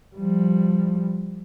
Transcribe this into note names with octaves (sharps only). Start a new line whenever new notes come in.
F3 G3